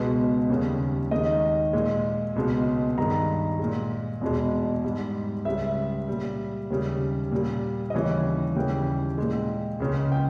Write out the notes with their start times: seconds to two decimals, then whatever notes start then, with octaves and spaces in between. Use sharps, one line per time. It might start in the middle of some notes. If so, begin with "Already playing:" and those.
Already playing: C#2 B2 G#3 B4
0.50 D#2 C#3 G3
1.11 D#2 D#3 G#3 D#5
1.73 A#2 G#3
2.36 C#2 B2 G#3
2.97 G2 D#3 G#3 A#5
3.59 A#2 G#3
4.21 E2 B2 G#3
4.84 G#2 G3
5.45 C#2 C#3 G3 E5
6.08 A#2 G3
6.70 D#2 C#3 G3
7.31 A#2 G3
7.90 D#5
7.94 D#2 C#3 E3 G3 C#5
8.56 D#2 C#3 E3 G3 G5
9.18 A#2 G#3
9.80 C#2 C#3 G#3
10.12 G5